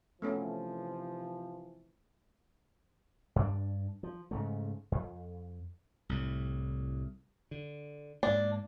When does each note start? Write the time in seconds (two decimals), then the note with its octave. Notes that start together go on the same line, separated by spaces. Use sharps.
0.22 C3 E3 F3 A3 B3 C#4
3.36 G2 D4
4.03 F3
4.31 G#2 C#3 A3
4.92 F2
6.09 C2 A2
7.51 D3
8.23 G#2 A#3 D4